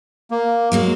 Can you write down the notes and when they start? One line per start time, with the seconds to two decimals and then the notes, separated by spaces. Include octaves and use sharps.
0.31 A#3
0.72 F#3 G#3 A#3